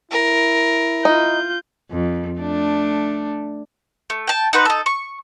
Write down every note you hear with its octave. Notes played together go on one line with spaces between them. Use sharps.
E4 A#4
D#4 F4 G6
F2
A3 D4
A3
G5 A5
D#4 F#4 B4 C5
D#4 A4
C#6